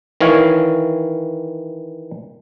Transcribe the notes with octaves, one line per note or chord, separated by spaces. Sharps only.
D#3 E3 C#5 F5 G#5